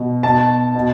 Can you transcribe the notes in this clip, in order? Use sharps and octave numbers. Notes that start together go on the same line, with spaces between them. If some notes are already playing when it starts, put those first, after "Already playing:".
Already playing: B2
B2 A5
B2